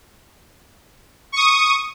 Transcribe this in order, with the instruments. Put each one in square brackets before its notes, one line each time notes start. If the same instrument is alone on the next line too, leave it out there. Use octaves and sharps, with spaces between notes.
[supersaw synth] C#6 D#6